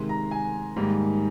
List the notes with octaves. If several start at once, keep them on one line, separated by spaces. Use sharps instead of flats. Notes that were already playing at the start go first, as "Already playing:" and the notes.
Already playing: C3 D#3 G#3 C6
A#5
G#5
G#2 D#3 G3 A#3